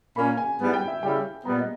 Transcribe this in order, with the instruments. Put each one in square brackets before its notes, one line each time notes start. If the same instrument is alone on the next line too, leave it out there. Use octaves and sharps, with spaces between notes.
[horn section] A#2 A#3 C#4 [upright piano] B5
[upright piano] G#5
[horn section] G#2 G3 B3 E4
[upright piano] G5
E5
[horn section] C#3 G3 C#4 E4 G4 [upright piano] G5
[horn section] A#2 G3 B3 [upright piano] A#5
[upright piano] D#5